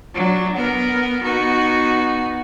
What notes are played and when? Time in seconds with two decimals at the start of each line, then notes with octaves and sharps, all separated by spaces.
0.14 F#3 D4
0.56 B3 A#4
1.23 B3 D#4 F#4